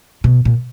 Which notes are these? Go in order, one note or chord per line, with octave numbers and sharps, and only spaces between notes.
B2
A#2